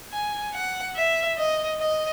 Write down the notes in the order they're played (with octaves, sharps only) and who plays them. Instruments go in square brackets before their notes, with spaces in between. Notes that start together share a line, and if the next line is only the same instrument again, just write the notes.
[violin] G#5
F#5
E5
D#5
D#5